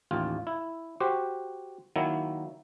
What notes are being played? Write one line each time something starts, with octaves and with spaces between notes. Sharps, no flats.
A1 D#2 F4
E4
F#4 G4 C5
D#3 F#3 A#3 E4